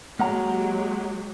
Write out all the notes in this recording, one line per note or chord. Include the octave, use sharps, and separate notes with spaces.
F#3 G#3 A#3 G4 F#5 A#5